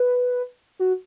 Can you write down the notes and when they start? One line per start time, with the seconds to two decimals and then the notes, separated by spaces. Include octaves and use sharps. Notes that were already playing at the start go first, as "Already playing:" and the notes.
Already playing: B4
0.79 F#4